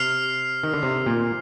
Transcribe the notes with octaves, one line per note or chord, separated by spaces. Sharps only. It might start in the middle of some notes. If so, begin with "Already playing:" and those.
Already playing: C3 F6 C7 F7
D#3
D3
C3
A#2